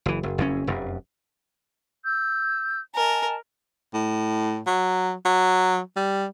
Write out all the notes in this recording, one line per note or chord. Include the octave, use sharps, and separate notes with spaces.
F#1 E3
F#1
F#1 F2 C#3 C#4
F1 F#2
E6 G6
A#4 D#5 G#5 A5
A2
F#3
F#3
G3